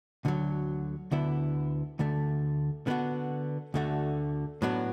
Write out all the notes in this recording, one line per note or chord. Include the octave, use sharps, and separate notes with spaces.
D2 D3 F#3
D2 D3 B3 E4
D2 D3 A3
D3 B3 D4 F#4
D2 D3 A3 F#4
A2 F#3 B3 D4 F#4